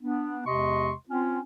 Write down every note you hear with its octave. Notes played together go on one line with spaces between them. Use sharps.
B3 D4
E2 C3 G#3 D#5 C6 C#6
C4 C#4 F4